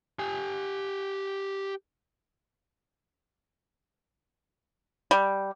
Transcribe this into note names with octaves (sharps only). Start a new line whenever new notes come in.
G4 G#5
G3